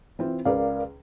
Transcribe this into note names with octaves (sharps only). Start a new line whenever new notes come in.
E3 C4 F4
C#2 G#4 A#4 B4 D5 F5